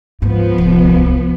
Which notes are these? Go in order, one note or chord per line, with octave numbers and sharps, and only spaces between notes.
D2 G#2 F3 B3
D1 C2